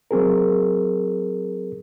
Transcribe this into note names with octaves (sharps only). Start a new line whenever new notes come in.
F#3 C4 G#4 A#4